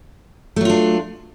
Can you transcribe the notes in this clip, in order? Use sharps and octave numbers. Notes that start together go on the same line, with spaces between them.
F#3 A3 D4 F4